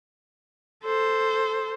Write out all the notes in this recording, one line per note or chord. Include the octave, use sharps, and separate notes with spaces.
A4 C5